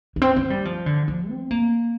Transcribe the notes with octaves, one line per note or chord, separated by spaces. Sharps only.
A#3
C4
C4
G3
F3
D3
F3
C4
A#3